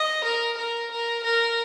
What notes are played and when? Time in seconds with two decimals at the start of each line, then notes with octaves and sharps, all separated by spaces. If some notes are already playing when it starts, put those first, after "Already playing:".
Already playing: D#5
0.24 A#4
0.57 A#4
0.91 A#4
1.24 A#4